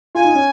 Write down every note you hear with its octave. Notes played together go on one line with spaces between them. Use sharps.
F4 G#5
D#4
C#4